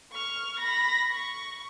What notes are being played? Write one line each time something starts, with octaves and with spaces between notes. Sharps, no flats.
C#6 F6
B5 A#6
C#6